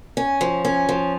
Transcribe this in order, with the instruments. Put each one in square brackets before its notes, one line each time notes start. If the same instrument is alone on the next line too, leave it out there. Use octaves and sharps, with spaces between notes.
[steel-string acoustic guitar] C#4
F3
C#4
F3